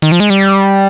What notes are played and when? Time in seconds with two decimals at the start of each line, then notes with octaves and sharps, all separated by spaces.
0.02 D#3
0.12 F3
0.20 G#3
0.30 G3